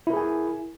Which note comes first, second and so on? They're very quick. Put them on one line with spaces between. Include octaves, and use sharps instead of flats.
E4 A#4 G#4 G#5